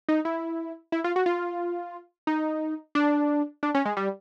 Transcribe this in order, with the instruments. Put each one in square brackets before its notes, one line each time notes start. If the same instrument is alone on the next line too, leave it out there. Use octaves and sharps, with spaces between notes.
[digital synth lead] D#4
E4
E4
F4
F#4
F4
D#4
D4
D4
C#4
G#3
G3